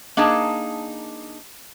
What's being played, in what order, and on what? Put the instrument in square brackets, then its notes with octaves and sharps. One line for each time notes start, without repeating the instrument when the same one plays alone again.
[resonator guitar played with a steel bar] A#3 D4 D#4 G#4 A5